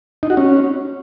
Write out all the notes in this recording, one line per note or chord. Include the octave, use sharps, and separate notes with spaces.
D#4
F#4
C#4